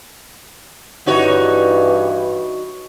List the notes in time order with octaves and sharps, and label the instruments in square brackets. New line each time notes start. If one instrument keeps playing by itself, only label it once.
[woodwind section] G2 E3 [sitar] D#4 F#4 C#5